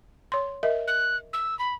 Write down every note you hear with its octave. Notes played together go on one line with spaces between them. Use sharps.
C#5 C6
A#4 D#5 E5
F#6
E6
B5